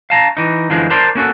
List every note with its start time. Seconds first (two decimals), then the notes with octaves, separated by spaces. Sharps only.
0.10 F5 A5 A#5
0.37 E3 D#4
0.70 F#2 D3 E3 F3 G#3
0.90 A#4 C5 D5 A5 C6
1.15 A#3 C#4 F#4 A4